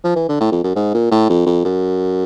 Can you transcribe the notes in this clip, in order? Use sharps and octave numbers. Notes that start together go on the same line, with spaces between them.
F3
E3
D3
A2
F2
F#2
G#2
A#2
A2
F2
F2
F#2